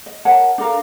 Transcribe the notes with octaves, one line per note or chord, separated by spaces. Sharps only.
D#5
A#4 C#5 F#5 A5
D4 A4 A#4 F5